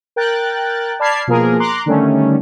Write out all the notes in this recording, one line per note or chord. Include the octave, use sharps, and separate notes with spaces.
A#4 G5 F#6 A6
D5 A5 B5 F6 G#6 C7
B2 F3 A#3 G#4 A#4
A#5 C6 D6 F#6
D3 D#3 G3 A3 C#4